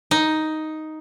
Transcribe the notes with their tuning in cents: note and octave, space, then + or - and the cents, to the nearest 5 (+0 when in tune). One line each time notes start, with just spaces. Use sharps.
D#4 +5